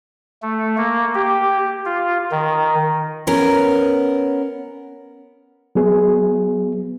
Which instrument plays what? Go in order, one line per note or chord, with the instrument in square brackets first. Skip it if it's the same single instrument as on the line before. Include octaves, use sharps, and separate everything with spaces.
[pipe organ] A3
A#3
G4
F4
D#3
[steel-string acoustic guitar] B3 C#4 A#4
[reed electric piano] F#3 B3 G#4